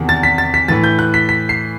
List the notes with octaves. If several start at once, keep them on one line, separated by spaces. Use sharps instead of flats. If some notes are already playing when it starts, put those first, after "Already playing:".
Already playing: E2 C3 D#3
A6
B6
A6
B6
A2 E3 A6
G6
F#6
B6
B6
C7